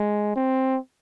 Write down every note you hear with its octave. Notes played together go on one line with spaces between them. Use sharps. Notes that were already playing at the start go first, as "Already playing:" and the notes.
Already playing: G#3
C4